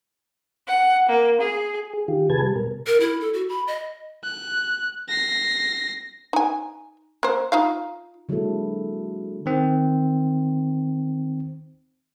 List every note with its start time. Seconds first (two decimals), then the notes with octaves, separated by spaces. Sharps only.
0.66 F#5
1.08 A#3
1.40 G#4
1.93 G#4
2.08 D#3 F4 G4
2.30 C3 G#4 B4 A5 G#6
2.42 G3
2.56 B2 A#4
2.87 A#4
3.00 E4
3.21 A4
3.34 F#4
3.49 B5
3.67 D#5
4.24 F#6
5.09 A#6 C7
6.33 D#4 G#5
7.23 A#3 C5
7.52 D#4 F4 F5
8.29 D3 F#3 G#3 A#3 E4 A4
9.46 D#3 C4